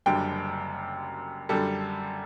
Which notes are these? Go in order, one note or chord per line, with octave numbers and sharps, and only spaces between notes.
F#1 F#2 D3 G3 G5
F#2 D3 G3 A4